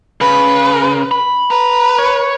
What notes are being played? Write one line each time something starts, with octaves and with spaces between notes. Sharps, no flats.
C#3 B4
B5
B4 A#5
C#5